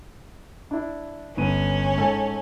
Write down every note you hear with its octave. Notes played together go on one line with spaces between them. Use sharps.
D4 E4
G1 B3 C#4 D#7
G#2 A4 G#5